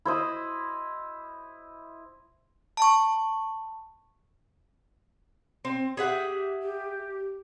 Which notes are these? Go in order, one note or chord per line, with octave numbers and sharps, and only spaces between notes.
E4 C5 D#5
A5 C#6
C4
G4 G#4 E5 F#5
G4